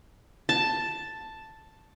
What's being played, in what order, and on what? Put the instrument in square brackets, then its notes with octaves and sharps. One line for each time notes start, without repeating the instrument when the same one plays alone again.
[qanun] A5